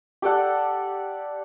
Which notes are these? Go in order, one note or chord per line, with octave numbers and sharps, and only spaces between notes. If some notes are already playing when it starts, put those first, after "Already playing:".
G4 A4 D5 F#5